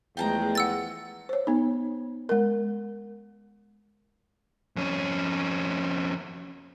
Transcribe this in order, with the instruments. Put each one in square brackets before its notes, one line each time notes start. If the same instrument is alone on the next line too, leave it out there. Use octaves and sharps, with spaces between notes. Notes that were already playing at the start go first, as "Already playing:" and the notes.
[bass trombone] E2 [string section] F3 G#3 A3 [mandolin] G5 A5 A#5
[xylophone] F#5 E6 A6
[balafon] C5 C#5
B3 D#4
G#3 A#4
[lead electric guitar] F2 C#4